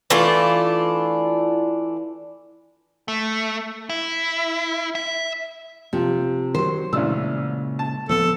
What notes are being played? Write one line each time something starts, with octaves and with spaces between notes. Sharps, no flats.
E3 A3 D4 F4
A3
E4
E5
C3 F3
D#3 F#3 C5
A1 A#2 C#3 G#3 D4 E6
A5
D1 F3 B3 A4